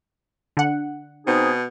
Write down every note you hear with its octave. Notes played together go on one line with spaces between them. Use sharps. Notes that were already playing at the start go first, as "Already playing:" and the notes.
D3 F#5
B2 C4 D#4 G#4